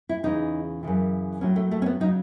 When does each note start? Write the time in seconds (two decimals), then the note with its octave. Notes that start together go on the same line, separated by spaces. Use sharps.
0.09 E4
0.23 E2 C#3 E3 D#4
0.83 F#2 C#3 E3
1.41 A2 F#3 C#4
1.56 A3
1.71 A3
1.82 C#4
1.86 B3
2.00 C#3 F#3 D#4